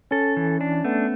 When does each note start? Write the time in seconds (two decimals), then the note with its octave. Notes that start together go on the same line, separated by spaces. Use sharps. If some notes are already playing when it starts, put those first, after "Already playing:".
0.11 C#4 A4
0.37 E3
0.61 D4
0.84 A3 B3